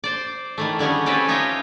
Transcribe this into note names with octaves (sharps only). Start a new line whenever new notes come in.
C5 D5
D#3 E3 A3
D3 G3 C#4 G#4
C4 C#4 G4 A4 B4 D5
D#4 F4 G4 C#5 D#5 E5